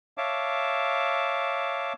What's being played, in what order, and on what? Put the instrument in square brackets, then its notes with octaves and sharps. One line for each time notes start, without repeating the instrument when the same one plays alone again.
[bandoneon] C#5 E5 F5 A5 D6